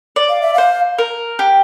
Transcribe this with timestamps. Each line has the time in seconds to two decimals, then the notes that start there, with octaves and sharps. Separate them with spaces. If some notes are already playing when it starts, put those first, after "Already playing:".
0.16 D5
0.29 F5
0.42 E5
0.54 C5 F5
0.98 A#4
1.39 G4